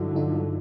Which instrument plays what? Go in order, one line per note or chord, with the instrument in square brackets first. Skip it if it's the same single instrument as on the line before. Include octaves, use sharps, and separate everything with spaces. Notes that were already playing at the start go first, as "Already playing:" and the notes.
Already playing: [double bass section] G2 D3 F#3 [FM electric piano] D#4 E4 F#4
[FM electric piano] D#4 F4